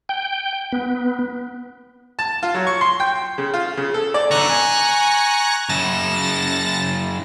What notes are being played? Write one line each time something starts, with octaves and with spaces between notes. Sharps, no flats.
G5
B3
A5
F4
F#3
C#6
C6
G5
C#3
F4
C#3
A4
D5
B1 D3 A#5 C#6 F#6
G#5
F#2 C#3 A5 A6 A#6